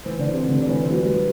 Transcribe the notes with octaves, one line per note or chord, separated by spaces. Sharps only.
E3 C5
D3 D5
C3 C5
D3
D5
E3 C5
C5
F#3 B4
G3